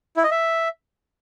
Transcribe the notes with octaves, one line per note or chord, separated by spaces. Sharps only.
E4
D#5
E5